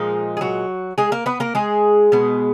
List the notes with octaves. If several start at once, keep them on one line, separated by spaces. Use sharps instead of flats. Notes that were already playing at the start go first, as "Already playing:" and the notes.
Already playing: A#2 F3 G#3 D#4
G#4
F#3 F#4
G#3 G#4
A#3 A#4
B3 B4
A#3 A#4
G#3 G#4
B2 G#3 B3